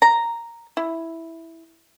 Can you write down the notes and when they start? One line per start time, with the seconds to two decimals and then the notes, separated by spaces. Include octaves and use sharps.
0.02 A#5
0.77 E4